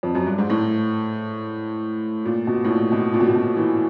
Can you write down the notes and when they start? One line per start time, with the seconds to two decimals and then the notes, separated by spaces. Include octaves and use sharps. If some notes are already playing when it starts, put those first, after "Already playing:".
0.03 F2
0.15 F#2
0.27 G2
0.38 G#2
0.50 A2
2.25 A#2
2.47 B2
2.64 A2
2.70 A#2
2.92 B2
3.14 A#2
3.20 B2
3.27 A#2
3.35 B2
3.56 E3